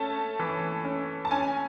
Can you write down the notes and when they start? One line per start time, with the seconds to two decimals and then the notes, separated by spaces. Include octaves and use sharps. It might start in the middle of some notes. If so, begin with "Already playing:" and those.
Already playing: A3 C#4 A5
0.39 E3
0.85 C#4
1.25 A5
1.31 C#4 G#5